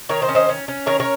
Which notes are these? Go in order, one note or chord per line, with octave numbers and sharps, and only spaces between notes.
D#3 A#4 C#5
C5 D#5
C#4
C5 D#5
C#4
C#4
D#3 A#4 C#5
A#4 C#5